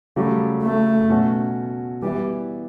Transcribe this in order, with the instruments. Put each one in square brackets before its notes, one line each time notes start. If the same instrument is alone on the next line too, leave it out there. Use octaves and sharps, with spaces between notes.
[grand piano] C#3 F#3 A3 [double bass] G3
[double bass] A3
[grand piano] B2 F#3 C#4 F#4 A4
[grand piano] E3 B3 E4 [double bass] G3